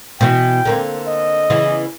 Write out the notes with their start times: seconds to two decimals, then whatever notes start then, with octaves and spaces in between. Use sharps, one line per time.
0.21 B2 E3 G5
0.65 D3 A#3 C4
1.07 D#5
1.50 C#3 E3 B3